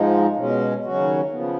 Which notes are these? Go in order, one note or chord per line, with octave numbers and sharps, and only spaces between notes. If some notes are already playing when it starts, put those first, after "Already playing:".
Already playing: G#2 F3 G#3 D#4
B2 G#3 C#4
D#2 C#3 F#3 C#4 F#4
C#3 F3 B3